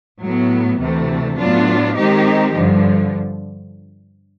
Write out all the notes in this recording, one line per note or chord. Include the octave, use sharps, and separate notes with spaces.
A2 F#3 B3
D2 C3 E3 A3
A2 F#3 B3 D4 F4
D#3 G#3 C4 D#4 G4
G2 D3 F3